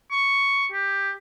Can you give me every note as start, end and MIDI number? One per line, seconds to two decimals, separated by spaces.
0.11 0.66 85
0.72 1.11 67